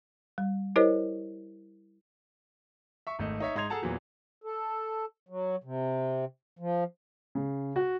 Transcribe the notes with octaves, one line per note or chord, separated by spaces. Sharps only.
G3
E4 G4 A#4 C5 C#5 D#5
E5 C#6
G#1 A3 D#5
D#4 C#5 E5
G#2 D#4 C6 G#6 F7
G#4 A4 F#5 A5 A#5
E2 A#2 E3 F#3
A4
F#3
C3
F3
C#3
F#4